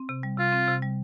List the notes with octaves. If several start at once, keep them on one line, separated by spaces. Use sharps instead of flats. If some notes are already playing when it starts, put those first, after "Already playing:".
Already playing: C4
C3
G3
C3 F4
C4
C3
G3